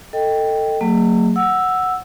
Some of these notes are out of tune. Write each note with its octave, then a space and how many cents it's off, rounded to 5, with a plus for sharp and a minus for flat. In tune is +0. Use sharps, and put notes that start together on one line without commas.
A4 +20 D#5 +0 G5 +0
F#3 +0 A#3 -45 G#4 -15
F#5 -5 E6 +0